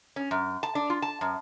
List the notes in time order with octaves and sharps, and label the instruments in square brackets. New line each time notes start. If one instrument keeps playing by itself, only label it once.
[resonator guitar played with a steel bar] C#4
F#2
A5
D4
F4
A5
F#2